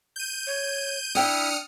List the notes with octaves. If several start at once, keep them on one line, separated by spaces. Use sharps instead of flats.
G6 D#7
C#5
D4 E4 G5 D#6 F6 C#7